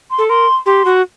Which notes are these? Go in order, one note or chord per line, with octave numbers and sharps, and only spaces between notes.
C6
A4
A#4 C6
G4 C6
F#4